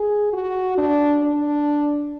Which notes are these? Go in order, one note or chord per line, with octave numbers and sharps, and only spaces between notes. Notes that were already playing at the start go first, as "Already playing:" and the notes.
Already playing: G#4
F#4
D4
D4